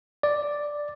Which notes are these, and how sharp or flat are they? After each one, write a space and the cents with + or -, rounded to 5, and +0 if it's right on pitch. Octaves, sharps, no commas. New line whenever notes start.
D5 +0